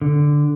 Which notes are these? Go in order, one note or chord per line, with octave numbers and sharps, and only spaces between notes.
D3